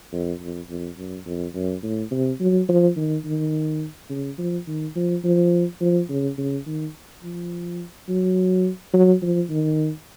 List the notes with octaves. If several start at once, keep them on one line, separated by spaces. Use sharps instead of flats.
F2
F2
F2
F#2
F2
F#2
A2
C3
F#3
F3
D#3
D#3
C#3
F3
D#3
F3
F3
F3
C#3
C#3
D#3
F3
F#3
F#3
F3
D#3